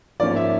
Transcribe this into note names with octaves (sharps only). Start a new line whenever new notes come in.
G#2 F3 A#3 C#4 D5
E5